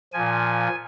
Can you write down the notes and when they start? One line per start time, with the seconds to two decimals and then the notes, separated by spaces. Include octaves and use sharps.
0.13 A#2 F3 G#5